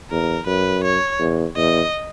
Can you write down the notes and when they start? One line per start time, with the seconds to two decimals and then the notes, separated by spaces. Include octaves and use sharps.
0.11 E2 A#4
0.47 F#2 B4
0.84 C#5
1.20 E2
1.56 E2 D#5